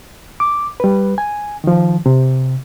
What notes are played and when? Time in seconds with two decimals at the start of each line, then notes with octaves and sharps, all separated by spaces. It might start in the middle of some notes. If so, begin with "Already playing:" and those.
0.40 D6
0.80 G3 B4
1.18 G#5
1.64 D#3 F3
2.06 C3